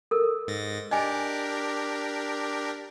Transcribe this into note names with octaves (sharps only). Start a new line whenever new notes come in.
A4 A#4
G#2 A6 A#6
D4 G4 A#4 D#5 G#5